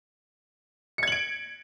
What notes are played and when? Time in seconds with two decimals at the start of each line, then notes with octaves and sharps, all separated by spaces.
0.98 C#7
1.03 G#6
1.07 F#7
1.12 D7